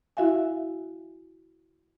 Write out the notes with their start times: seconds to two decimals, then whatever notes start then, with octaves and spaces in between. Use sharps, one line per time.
0.17 E4 F#4 E5 F5 G#5